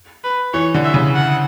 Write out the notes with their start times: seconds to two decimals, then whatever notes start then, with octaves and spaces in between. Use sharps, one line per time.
0.24 B4
0.53 E3 C#5
0.74 D3
0.84 E5
0.94 C#3
1.15 F#5